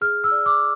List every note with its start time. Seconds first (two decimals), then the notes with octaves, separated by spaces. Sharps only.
0.01 G#4 F6
0.24 E6
0.31 D5
0.46 D6